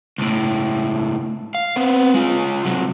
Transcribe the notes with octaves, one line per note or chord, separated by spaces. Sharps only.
C#2 A2
F5
B3 C4
G#3 F4
C3 F#3